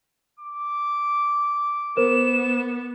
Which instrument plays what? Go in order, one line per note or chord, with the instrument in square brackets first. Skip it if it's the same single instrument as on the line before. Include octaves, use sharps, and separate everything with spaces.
[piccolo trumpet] D6
[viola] B3 [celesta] A#4 C5 [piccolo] E7